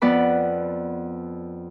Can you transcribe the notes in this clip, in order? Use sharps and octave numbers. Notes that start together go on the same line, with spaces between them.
F2 B3 D5 F#5 B5